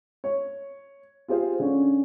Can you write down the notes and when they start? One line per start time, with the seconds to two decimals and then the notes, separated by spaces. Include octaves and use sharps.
0.24 C#5
1.28 F4 G4 G#4 C5 F5
1.60 D3 C#4